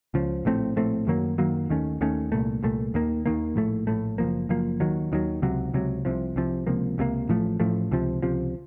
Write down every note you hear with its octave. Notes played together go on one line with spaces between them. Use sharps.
C#2 C#3 F3
A#1 A2 A3 C4
A#1 A2 A3 C4
F#2 D#3 F#3 A#3
F#2 D#3 F#3 A#3
D#2 D#3 A3 C#4
D#2 D#3 A3 C#4
C2 A#2 A3
C2 A#2 A3
D#2 D#3 A#3
D#2 D#3 A#3
A#1 A2 A3
A#1 A2 A3
F#1 F#2 F3 A#3
F#1 F#2 F3 A#3
D#2 D#3 F#3
D#2 D#3 F#3
C#2 C3 F#3
C#2 C3 F#3
C2 C3 F3
C2 C3 F3
C#2 C3 F3 A#3
C#2 C3 F3 A#3
A1 A2 F3 A3
A1 A2 F3 A3
C#2 C3 F3
C#2 C3 F3